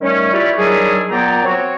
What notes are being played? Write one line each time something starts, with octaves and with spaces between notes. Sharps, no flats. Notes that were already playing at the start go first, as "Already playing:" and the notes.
D#3 G3 A3 C#4
E4 F4 G4 B4 C#5 D5
D#3 F#3 G3 D4 E4 G#4
A#2 F#3 B3 D5 G5 A#5
C4 F#4 C#5